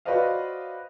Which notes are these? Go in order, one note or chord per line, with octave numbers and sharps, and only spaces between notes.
F#4 B4 C5 D5 D#5 F5